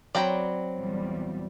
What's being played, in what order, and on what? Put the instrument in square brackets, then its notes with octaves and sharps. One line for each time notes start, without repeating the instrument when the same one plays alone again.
[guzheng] F#3 C4 B5 [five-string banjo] D5 G5 A#5
[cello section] E2 A#2 G3